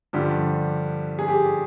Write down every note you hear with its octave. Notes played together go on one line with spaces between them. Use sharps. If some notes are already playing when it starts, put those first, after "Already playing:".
G2 D3 F3 G4
G#4
G4